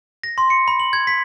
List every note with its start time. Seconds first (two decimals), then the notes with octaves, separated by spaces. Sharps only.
0.24 A#6
0.38 C6
0.50 C#7
0.68 B5
0.80 F#7
0.93 G#6
1.07 B6